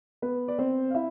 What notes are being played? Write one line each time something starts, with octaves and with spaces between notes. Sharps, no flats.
B3 B4
D5
C4 C5
F5
E4 E5